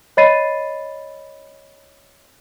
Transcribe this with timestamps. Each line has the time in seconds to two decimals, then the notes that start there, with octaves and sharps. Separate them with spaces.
0.17 C#5 D#5 B5 A6 C7 D#7